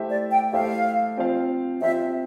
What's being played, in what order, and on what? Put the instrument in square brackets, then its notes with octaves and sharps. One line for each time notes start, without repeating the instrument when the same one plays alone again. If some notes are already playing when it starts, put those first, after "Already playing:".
Already playing: [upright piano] A3 E4 G4 C5 E5
[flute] D5
G5
[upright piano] A3 E4 G4 C5 E5 [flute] F5
[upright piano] F3 C4 F4 C5 F5
[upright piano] F3 C4 F4 C5 F5 [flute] E5